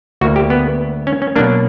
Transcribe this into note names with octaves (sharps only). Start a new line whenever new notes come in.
D2 D3 A#3 F#4
G4
B3
C#4
C#4
B2 F#3 A#3 D4